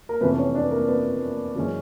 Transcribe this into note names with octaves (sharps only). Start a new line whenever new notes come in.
A#4
F2 C3 E3 A3 B3 C#4 B4
C#4 C#5
D4 D5
B4
A#3 A#4
B3 B4
F#2 C#3 E3 G#3 C#4